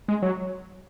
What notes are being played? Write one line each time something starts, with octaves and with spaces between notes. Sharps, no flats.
G#3
F#3